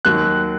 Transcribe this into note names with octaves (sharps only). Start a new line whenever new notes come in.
D#2 D#3 F#3 F#6